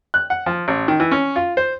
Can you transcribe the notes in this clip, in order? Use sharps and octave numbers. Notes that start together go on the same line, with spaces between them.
F#6
F#5
F3
A1
D#3
E3
C#4
F4
C5